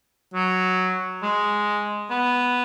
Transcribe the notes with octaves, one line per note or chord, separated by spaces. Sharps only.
F#3
G#3
B3